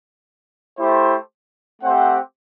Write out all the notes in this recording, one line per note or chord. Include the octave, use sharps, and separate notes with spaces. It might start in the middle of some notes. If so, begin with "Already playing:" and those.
A3 E4 G4 C5
A3 C4 G4 C5 F#5